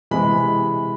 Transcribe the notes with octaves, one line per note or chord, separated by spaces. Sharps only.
C3 E3 G#3 B5